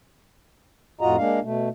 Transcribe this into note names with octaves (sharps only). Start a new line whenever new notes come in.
F2 A2 F4 F#4 D#5 A#5
G#3 A#3 D4 F5
B2 A3